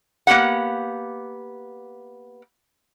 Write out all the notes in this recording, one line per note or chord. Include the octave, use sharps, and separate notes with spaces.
A#3 B3 G4 F#5